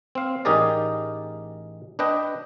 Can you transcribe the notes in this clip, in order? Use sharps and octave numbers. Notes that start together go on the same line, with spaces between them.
C4 F5
A1 D#4 G4 G#4 A#4 D5
D4 B4 D#5 G5